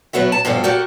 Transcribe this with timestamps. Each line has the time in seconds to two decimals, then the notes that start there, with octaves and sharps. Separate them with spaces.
0.13 B2 F#3 B3 F#4 E5
0.32 A5
0.45 G2 B2 F3 D4 A4
0.64 F#4 G4 A4 A#4